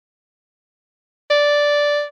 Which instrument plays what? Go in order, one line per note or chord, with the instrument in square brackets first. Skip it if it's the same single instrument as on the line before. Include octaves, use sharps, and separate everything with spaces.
[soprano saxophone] D5